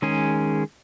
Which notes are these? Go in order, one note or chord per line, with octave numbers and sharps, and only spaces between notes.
D#3 G#3 C#4 G#4